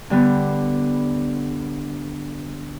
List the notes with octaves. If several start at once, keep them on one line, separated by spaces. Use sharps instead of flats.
D3 G3 B3